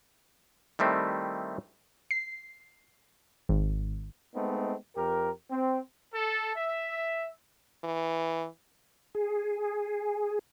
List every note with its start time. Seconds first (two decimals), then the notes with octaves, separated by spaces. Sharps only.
0.79 D#3 G3 A3 C4 E4
2.11 C7
3.49 G#1
4.35 G#3 A3 B3 C4 D#4
4.97 F2 G4 A#4
5.51 C4
6.14 A4
6.56 E5
7.84 E3
9.15 G#4